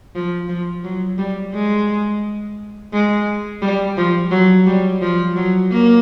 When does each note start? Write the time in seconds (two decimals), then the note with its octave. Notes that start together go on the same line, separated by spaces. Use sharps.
0.15 F3
0.49 F3
0.84 F#3
1.18 G3
1.53 G#3
2.93 G#3
3.62 G3
3.97 F3
4.31 F#3
4.66 G3
5.01 F3
5.36 F#3
5.71 A#3